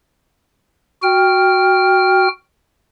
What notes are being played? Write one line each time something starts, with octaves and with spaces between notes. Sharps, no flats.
F#4 G5 F6